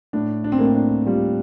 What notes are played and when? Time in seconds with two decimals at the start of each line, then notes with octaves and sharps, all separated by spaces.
0.13 A2 D4
0.44 D4
0.52 C4
0.59 A2 A#3
0.66 C4
0.75 D4
1.06 G3 F4